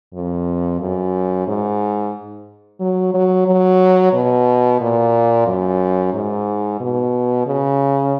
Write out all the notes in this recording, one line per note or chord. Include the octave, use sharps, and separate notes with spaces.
F2
F#2
G#2
F#3
F#3
F#3
B2
A#2
F#2
G#2
B2
C#3